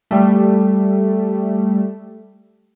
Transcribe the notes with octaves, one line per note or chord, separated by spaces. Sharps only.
G3 A3